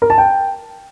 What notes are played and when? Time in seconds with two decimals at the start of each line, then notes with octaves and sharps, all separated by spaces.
0.02 A#4
0.10 A5
0.18 G5